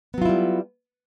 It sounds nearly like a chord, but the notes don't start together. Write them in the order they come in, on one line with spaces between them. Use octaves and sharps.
B3 F#3 F4 E4 G3